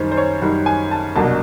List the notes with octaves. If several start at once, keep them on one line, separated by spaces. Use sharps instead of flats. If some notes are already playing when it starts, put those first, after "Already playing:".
Already playing: F#2 D#3 G3 C5
C5
C#5
F#2 D#3 G3
G#5
A5
C2 B2 F#3 A#3 D4 A5